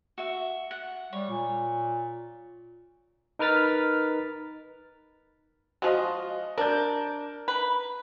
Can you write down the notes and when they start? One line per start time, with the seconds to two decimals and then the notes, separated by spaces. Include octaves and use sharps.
0.18 F#4 E5
0.71 F#5
1.13 G3 C#5
1.30 A#2
3.39 D#4 A#4 B4 F6 A6 B6
5.82 F3 G#3 F#4 D#5
6.58 D4 A#4 G6
7.48 B4